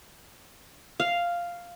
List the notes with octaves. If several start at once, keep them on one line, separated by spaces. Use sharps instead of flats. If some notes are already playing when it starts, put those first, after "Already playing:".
F5